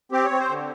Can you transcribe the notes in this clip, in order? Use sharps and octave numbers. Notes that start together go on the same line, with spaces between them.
C4 G4
C#5
C4
C5
D3